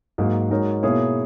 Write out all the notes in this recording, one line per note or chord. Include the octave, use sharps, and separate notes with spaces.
G#2 F#3 A#3
G#3 D#4 F#4 A#4 C#5
B2 A#3 E4 G#4 C#5